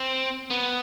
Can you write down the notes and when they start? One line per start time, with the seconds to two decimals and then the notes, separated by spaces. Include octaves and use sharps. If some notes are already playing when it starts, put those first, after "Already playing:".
Already playing: C4
0.51 B3